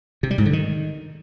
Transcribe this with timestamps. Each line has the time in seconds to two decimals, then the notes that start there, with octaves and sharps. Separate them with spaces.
0.23 C3
0.31 G3
0.38 G#2
0.46 D3
0.53 D#3